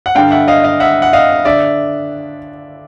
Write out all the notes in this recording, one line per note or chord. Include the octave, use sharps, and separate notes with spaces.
F#5
G2 D3 F5 G5
E5 F#5
D#5 F5
D#5 F5
E5 F#5
F#5
D#5 F5
D3 D5 E5